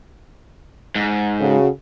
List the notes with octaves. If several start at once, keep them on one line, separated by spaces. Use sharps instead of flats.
G#2
C#3 F#4 A4